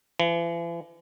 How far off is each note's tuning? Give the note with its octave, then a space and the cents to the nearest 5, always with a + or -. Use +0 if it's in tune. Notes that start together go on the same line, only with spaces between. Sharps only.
E3 +45